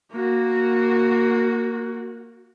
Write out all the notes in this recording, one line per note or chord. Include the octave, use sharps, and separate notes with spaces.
A#3 F#4